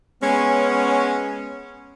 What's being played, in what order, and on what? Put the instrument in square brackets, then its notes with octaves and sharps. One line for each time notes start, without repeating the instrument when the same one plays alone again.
[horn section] G#3 B3 C#4